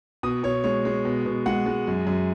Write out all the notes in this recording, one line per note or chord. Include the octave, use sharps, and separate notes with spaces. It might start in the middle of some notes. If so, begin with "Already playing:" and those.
B2 D#6
B2 C#5
G#3 C#5
G#3
B2
B2
G#3 F#5
G#3
F#2
F#2